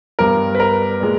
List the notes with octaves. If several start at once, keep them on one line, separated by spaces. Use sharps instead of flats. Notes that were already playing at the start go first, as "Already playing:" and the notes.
G2 G3 B3 A#4
B4
A#4
A#2 G#3